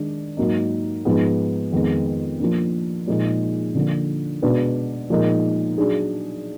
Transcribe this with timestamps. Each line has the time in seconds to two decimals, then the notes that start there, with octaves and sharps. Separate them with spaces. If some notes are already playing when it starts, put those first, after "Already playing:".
Already playing: D#3 G#3 D4
0.37 G#2 F#3 A#3 D#4
1.05 G#2 F3 G#3 B3
1.72 F2 D#3 G#3 B3
2.40 F3 A#3 D4
3.07 A#2 F3 G#3 D#4 G#4
3.75 D3 F3 A#3
4.42 B2 G#3 D4 F#4 B4
5.10 A#2 F3 G#3 D#4 A#4
5.78 F#3 D4 G#4